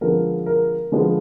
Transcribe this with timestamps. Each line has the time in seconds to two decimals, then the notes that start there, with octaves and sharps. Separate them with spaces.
0.01 D3 F3 G#3 B3 A#4
0.46 A#4
0.92 D3 F3 G#3 B3